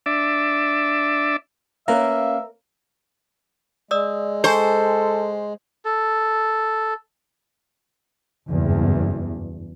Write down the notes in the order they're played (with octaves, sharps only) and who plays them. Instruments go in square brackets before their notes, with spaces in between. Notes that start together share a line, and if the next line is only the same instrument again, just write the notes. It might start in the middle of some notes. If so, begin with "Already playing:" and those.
[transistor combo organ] D4 D5 E5
[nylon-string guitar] A#3 C#4 B4 [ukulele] A#4 [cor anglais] E5 [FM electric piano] F5
[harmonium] G#3 [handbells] D5 D#6 E6
[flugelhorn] A4 [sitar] C5 [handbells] G#5 C#6
[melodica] A4
[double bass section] F#1 E2 G2